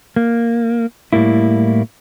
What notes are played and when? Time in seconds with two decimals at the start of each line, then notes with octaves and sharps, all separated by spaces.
0.16 A#3
1.13 A2 G3 A#3 E4